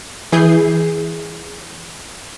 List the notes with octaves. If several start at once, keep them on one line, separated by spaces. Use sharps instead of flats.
E3 G#4 G6 C7